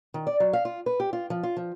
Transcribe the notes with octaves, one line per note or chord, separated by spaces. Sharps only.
D#3
D5
F#3
F5
F4
B4
G4
F4
F3
F4
F3